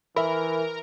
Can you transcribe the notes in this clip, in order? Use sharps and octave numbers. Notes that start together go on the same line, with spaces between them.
E3 A#4 E5 B5